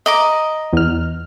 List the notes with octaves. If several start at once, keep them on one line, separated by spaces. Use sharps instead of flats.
D#5 A#5 D6
E2 F6